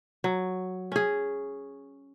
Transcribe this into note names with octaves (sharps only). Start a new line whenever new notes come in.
F#3
C#4 G#4